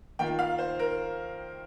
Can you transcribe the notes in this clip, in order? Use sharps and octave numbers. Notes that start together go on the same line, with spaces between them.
D#3 A#3 F4 G5
F5
C5
A#4